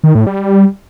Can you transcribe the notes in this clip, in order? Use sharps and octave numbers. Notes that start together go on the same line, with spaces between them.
D#3
A2
G3